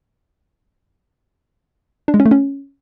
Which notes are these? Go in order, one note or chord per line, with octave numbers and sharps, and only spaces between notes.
D4
G#3
C#4
A3
C#4